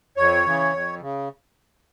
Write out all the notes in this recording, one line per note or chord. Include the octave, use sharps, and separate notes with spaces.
F2 C#5
C#3 E3
F2
C#3